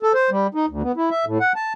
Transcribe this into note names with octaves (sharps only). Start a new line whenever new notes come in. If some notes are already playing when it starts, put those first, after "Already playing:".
A4
C5
G3
D#4
D2
B3
E4
E5
A2
F#5
A5